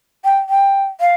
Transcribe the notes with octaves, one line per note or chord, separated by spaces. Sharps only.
G5
G5
F5